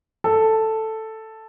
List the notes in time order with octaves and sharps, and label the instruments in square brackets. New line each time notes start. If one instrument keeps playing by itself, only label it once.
[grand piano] A4